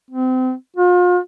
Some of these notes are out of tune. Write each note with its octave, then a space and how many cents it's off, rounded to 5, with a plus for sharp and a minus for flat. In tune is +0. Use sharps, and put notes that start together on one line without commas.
C4 -30
F4 +40